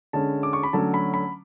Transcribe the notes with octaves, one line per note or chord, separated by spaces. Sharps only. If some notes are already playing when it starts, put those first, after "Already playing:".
D3 G#3 C#4 A5
D6
C#6
B5
D3 F#3 A3 C#4 A5
B5
B5